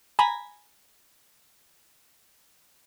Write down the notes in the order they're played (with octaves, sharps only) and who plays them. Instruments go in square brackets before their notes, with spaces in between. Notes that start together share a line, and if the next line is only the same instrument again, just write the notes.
[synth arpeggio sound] G#5 A#5 B5